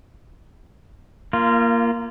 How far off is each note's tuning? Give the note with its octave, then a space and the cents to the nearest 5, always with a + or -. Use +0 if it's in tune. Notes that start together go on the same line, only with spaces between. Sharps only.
A#3 +0 F4 -25